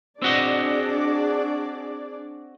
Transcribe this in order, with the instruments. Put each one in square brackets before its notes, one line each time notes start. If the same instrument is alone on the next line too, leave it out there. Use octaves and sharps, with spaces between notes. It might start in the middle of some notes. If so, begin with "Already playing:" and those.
[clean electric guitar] C4 F#4 D#5 [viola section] D4 G#4 D5